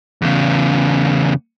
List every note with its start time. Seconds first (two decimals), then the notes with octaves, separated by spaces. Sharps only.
0.22 E2 C#3